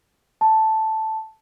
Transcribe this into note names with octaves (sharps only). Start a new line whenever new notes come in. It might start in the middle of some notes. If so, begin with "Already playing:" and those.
A5